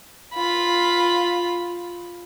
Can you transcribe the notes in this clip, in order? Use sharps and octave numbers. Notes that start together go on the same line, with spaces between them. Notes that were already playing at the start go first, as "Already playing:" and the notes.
F4 B5